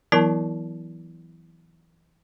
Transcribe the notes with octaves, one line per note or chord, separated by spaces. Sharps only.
E3 F#3 B3 E4 A#4 A5